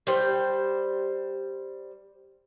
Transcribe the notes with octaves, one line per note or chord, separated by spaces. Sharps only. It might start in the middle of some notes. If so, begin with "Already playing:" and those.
G3 C5 G5